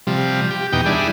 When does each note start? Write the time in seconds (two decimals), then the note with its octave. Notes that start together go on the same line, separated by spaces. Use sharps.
0.07 C3 F3 G3
0.51 G4
0.73 E2 B2 D#4 G4 G5
0.86 G3 D4 E4 G#4